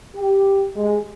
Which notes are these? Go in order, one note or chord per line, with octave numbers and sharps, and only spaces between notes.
G4
G#3